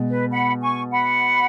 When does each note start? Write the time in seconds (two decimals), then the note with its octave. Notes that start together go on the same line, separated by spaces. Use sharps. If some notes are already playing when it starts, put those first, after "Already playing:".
Already playing: B2 G#3
0.10 B4
0.32 F#5 B5
0.61 G#5 C#6
0.92 F#5 B5